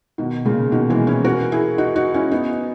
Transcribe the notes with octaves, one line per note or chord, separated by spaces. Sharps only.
B2 D#3
A#2 C#3
B2 D#3
E3 G#3
C#4 E4
F#4 A#4
E4 G#4
D#4 F#4
D#4 F#4
C#4 E4
B3 D#4